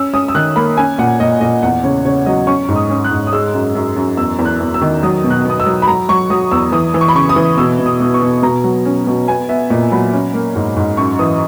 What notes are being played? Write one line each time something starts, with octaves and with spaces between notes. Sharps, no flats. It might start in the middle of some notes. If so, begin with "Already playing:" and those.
Already playing: C#4 E6
C#4 D#6
E6
D#3 F#6
A#3 B5
C#4 G#5
A#2 F#5
A#2 D#5
A#2 D#5
E2 F#5
C#3 C#5
C#3 C#5
F#3 D#5
C#4 C#6
G#2
D#6
C#4
F#6
G#2
D#6
G#3 E6
F#2
F#2
F#2
E2 E6
E2
F#6
E2
E6
D#3
F#3 D#6
B2
F#6
B3 D#6
E6
F#3
B5
F#3 A#5
F#3 C#6
F#3 D#6
E2 E6
E3 D#6
E3
C#6
B5
C#3 C#6
D#6
E3
B2 E6
B2
D#6
B2
C#6
B2
B2 A#5
F#3
C#4
B2
B3 G#5
B3 E5
A#2 D#5
F#3 B5
C#4
A#3
G#2
G#2
F#2 C#6
E3 D#6